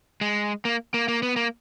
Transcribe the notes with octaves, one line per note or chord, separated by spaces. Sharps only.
G#3
A#3
A#3
A#3
B3
A#3